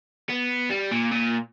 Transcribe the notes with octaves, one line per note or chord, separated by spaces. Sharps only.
B3
G3
A#2
A#2